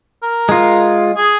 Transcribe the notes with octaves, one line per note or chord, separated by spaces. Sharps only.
A#4
G#3 F4
G#4